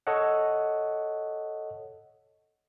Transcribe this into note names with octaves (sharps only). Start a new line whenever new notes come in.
A4 C#5 D#5 F#5